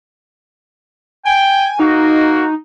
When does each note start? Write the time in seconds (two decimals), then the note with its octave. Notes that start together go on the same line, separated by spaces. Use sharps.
1.25 G5 G#5
1.80 A#3 D#4 F#4